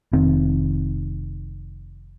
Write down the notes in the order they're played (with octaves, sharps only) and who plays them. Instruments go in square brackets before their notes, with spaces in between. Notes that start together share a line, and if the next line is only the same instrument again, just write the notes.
[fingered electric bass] F1 D#3 C4